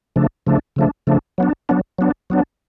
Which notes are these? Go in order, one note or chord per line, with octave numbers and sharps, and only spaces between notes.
C#3 F3 A3 D4
C#3 F3 A3 D4
C#3 F3 A3 D4
C#3 F3 A3 D4
F#3 B3 D4
F#3 B3 D4
F#3 B3 D4
F#3 B3 D4